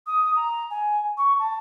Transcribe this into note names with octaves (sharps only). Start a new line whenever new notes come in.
D#6
A#5
G#5
C#6
A5